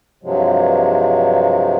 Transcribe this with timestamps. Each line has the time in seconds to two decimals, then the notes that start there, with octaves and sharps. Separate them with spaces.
0.23 G2 C3 F3 F#3 G#3